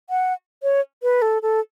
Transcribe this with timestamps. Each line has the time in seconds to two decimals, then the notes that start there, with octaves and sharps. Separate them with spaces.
0.10 F#5
0.63 C#5
1.03 B4
1.22 A4
1.42 A4